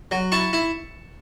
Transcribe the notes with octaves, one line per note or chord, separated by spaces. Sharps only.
F#3
E4 A5 C#6
E4